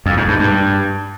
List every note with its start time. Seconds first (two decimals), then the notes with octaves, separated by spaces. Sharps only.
0.06 F2
0.17 G#2
0.28 G2
0.39 G2